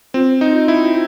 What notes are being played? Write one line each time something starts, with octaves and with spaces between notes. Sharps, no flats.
C4 F4
D#4
E4